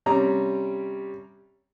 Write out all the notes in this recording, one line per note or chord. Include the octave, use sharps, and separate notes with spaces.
C3 G3 C#4 A#5